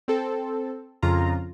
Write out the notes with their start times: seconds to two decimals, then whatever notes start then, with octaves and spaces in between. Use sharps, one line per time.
0.08 C4 A4
1.03 F2 C#3 F4 A#5